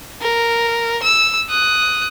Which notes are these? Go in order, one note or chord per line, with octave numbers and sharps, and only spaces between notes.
A#4
E6
D#6 F#6